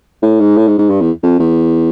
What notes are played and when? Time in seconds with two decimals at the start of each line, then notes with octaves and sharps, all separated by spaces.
0.22 A2
0.40 G#2
0.57 A2
0.68 G#2
0.78 G#2
0.90 G2
1.01 E2
1.23 F2
1.39 E2